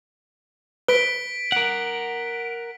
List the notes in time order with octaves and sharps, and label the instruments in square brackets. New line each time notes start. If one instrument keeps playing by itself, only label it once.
[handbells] B4 [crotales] B6 D7 G7
[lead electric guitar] A#4 F#5